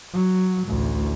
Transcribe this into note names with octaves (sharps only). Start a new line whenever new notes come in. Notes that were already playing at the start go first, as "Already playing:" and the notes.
F#3
A1 D2